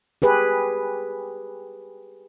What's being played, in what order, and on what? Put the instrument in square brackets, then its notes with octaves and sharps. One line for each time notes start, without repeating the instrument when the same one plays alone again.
[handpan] G4 G#4 B4